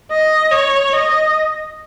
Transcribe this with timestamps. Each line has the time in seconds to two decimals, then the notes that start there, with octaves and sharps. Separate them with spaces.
0.11 D#5
0.51 C#5
0.92 D#5